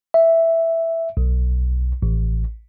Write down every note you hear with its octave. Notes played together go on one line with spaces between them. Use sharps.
E5
B1
A1